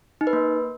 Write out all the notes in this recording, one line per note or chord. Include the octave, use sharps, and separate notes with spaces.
D#4
B4
A#3